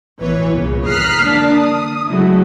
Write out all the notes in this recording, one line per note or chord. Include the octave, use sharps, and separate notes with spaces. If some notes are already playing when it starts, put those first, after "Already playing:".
A1 B2 E3 B4 C#5
C2 A#2 C#3
A#5 D#6 F6 F#6 B6 C7
D3 A#3 D4 A5
D#6
C#3 F#3 G#3 A3 E4 F#4